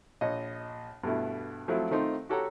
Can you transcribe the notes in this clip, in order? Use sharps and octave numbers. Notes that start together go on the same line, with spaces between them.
A#1 C#5 D#5
G2 B2 A3 E4
F3 F#3 A3 C4 E4 F4
D#3 A3 C4 D#4 F4
F#4 G4 A4 C#5 F#5 A#5